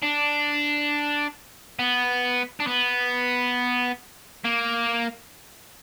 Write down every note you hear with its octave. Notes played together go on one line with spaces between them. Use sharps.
D4
B3
D4
B3
A#3